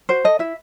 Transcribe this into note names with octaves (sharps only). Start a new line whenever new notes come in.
F#4 C5
A4 D#5
E4 E5